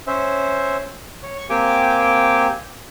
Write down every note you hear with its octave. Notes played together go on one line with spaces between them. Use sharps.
C#4 C5 E5
C#5
C#6
A#3 C4 G4 G5 G#5 D6